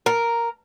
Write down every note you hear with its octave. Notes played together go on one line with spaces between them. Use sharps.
A#4